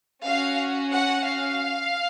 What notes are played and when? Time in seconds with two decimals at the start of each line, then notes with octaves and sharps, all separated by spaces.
0.23 C#4 F#4 F5
0.91 F#5
1.24 F5